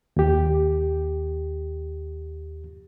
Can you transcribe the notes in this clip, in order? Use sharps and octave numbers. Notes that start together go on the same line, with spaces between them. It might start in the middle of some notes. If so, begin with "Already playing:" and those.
D#2 G4